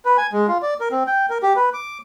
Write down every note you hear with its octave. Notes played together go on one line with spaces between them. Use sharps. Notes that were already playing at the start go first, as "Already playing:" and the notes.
B4
G#5
G#3
F4
D5
A#4
C4
G5
A#4
G4
B4
D6